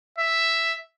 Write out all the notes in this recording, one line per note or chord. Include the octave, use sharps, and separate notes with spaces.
E5